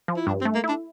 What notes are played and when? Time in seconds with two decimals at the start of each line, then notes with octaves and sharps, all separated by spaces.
0.08 F3
0.16 E4
0.27 G2 D4
0.41 C4
0.45 A3
0.55 A#3
0.64 D4 E4